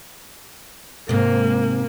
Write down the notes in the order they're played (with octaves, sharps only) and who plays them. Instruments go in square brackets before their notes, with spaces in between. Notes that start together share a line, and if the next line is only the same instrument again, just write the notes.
[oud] G#2 C3 [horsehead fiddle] A#3